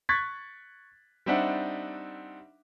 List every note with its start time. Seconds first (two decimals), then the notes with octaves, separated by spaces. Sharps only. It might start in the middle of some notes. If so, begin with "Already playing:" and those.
0.09 C#6 F#6 G#6 A6 B6
1.26 G3 C4 D4 D#4 E5 F#5